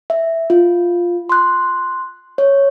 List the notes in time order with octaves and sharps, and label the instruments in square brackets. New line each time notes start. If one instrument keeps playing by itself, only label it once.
[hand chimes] E5
F4
C6 F#6
C#5